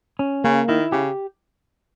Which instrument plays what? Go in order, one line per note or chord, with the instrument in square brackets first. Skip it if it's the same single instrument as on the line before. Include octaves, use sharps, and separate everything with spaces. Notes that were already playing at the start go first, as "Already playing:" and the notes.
[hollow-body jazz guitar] C#4
[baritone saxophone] C#3 [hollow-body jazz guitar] A#3
[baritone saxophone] D#3 [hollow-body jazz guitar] E4
[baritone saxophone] C#3 [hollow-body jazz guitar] G4